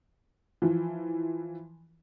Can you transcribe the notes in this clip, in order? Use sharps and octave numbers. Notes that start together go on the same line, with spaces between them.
E3 F3